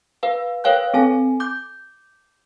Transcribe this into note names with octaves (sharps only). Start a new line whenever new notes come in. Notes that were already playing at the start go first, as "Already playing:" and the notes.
B4 F5
A#4 B4 C#5 F5 G5 F#6
C4 A4 G#5
D6 G6